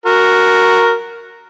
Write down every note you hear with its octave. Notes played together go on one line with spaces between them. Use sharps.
F#4 A#4